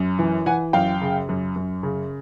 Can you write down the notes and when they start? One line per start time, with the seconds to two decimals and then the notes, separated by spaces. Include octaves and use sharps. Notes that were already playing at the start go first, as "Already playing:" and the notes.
Already playing: F#2
0.19 E3
0.46 E3 F#5 G#5
0.73 F#2 F5 G5
1.01 C#3
1.29 F#2
1.56 F#2
1.83 C#3